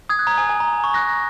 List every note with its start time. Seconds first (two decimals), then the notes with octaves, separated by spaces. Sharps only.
0.09 D#6 G#6
0.19 F#6
0.27 A#5
0.38 G#5
0.49 G#5
0.60 A#5
0.73 A#5
0.84 C#6
0.94 F#6 A#6